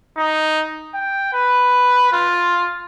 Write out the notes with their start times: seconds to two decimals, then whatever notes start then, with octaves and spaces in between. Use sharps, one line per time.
0.17 D#4
0.94 G5
1.33 B4
2.12 F4